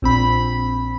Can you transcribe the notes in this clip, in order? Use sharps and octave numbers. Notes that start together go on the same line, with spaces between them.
A#1 C4 B5